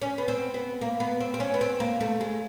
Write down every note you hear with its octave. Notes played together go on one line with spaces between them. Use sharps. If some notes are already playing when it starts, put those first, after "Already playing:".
C#4
B3
C4
B3
A#3
B3
C4
C4
C#4
B3
C4
A#3
A3
G#3